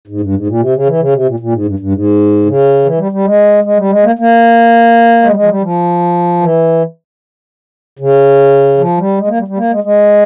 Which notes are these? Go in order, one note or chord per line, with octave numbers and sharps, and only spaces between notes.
G#2
G2
G#2
A#2
C3
C#3
E3
C#3
C3
A#2
A#2
G#2
G2
G2
G#2
C#3
E3
G3
G3
G#3
G#3
G3
G#3
A#3
A#3
G#3
G3
G#3
F3
G3
F3
E3
C#3
F3
G3
G#3
A#3
G3
G3
A#3
G#3
G#3